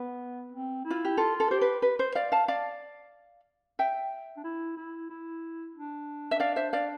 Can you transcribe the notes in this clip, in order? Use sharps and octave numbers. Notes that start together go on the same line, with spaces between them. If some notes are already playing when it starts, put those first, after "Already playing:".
Already playing: B3 B4
C4
E4
F4
G4
F4 A4
A4
G4 C5
B4
B4
C5
D5 F5
F5 A5
D5 F5
E5 G5
D4
E4
E4
E4
D4
E5
D5 F5
C5 E5
D5 F5